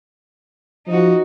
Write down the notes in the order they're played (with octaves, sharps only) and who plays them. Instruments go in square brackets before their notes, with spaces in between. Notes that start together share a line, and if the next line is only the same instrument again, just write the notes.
[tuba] F3 [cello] D#4 F#4